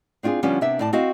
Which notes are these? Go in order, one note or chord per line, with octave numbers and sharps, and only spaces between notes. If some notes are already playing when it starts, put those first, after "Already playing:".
C4 D4 F4 F#4 G#4
D3 F3 G3 B3 C#4 D4
C3 B3 D4 E5
A2 D5 A5
C4 F#4 D#5 F5